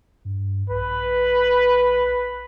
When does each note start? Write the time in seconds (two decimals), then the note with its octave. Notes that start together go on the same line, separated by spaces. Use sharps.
0.25 G2
0.70 A#1 B4